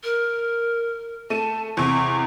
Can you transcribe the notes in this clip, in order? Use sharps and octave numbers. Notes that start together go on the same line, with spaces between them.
A#4
A3 A5 D#7
E2 C3 C#6